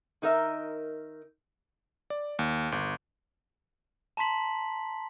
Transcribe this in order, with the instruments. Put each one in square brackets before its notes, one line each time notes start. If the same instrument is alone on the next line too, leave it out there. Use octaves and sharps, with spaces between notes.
[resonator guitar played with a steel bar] D#3 D#4 A#4 E5
[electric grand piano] D5
D#2
G1
[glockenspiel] A5 A#5 C6 B6 F#7